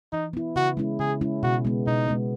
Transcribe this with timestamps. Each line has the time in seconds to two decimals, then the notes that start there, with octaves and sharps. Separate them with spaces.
0.12 E3 D#4
0.33 B3 E4
0.56 C#3 F#4
0.77 G#3 C#4 E4
1.00 C#3 G#4
1.21 G#3 C#4 E4
1.43 B2 F#4
1.65 G#3 B3
1.87 B2 D#4
2.08 G#3 B3